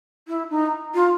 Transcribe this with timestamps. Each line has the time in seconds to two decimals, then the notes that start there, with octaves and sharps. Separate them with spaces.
0.27 E4
0.50 D#4
0.94 F4